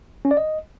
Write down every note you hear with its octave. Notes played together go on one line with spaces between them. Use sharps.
C#4
D5
D#5